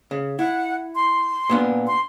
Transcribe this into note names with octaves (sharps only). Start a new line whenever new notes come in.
C#3
E4 F#5
C6
A#2 B3 D4
C6